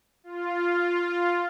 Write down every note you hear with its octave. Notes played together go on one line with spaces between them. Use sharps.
F4